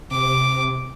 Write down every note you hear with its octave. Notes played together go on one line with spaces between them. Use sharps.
C3 D6